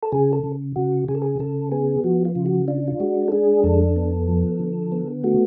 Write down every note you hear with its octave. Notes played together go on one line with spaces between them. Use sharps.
A4
C#3 G#4
A4
C#3
C#3 F#4
C#3 G#4
A4
G#4
C#3 A4
B3 G#4
F3 F#4
F4
C#3
F#4
D4 F4
F4
G#3 F#4
A4
D4 G#4
F2 A4
B3
F3
D3
B3
A3 F#4